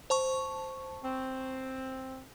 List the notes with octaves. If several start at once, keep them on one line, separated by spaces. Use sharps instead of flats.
C5 A5 C#6
C4